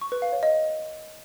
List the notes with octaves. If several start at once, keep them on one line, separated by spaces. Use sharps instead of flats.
C#6
B4
F5
C#5
D#5